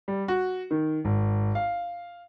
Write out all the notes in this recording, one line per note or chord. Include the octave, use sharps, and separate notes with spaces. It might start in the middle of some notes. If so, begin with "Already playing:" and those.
G3
F#4
D#3
G#1
F5